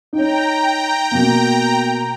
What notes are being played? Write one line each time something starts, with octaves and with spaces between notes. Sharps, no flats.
D#4 C#5 G5 A#5
B2 A#3